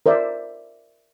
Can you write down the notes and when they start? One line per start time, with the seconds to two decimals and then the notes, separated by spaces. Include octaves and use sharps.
0.06 A#4 C5 D5 E5